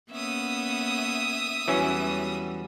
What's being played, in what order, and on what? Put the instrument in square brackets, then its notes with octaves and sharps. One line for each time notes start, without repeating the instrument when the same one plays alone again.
[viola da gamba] A#3 B3 C#4 [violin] E5 D#6
[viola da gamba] E2 G3 [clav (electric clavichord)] E3 F#3 C#4